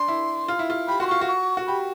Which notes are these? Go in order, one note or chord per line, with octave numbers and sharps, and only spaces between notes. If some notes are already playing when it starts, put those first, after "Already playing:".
Already playing: D4 C6
E4
F4
E4
F4
G4 B5
F#4 C6
F4 C#6
F#4
C#6
F#4
G4 B5